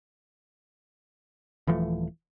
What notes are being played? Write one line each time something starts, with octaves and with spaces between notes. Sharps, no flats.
D#1 E3 F3 A3